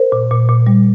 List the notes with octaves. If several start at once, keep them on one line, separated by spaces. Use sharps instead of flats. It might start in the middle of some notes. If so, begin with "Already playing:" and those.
Already playing: A#4 C5
A#2
A#2
A#2
G3